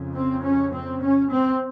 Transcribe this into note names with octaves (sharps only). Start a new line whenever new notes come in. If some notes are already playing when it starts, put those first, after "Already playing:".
Already playing: F2 C#3
C4
C#4
C4
C#4
C4